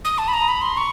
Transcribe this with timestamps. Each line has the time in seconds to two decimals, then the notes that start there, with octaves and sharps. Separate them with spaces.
0.05 D#6
0.18 A5
0.28 B5
0.33 A#5
0.48 B5
0.62 C6
0.77 C#6